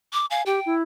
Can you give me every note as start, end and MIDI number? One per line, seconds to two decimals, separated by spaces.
0.13 0.26 86
0.31 0.42 77
0.31 0.43 80
0.46 0.60 67
0.46 0.74 79
0.66 0.83 64